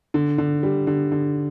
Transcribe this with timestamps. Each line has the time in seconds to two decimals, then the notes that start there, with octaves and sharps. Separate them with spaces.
0.14 D3
0.38 D3
0.63 G3
0.87 D3
1.12 D3